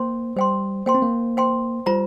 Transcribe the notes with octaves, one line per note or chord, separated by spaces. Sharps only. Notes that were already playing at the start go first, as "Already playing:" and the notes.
Already playing: A#3 C5 G5 C6
G3 C5 G5 C6
A#3 C5 G5 C6
C4
A#3
C5 G5 C6
G3 F4 C5 A#5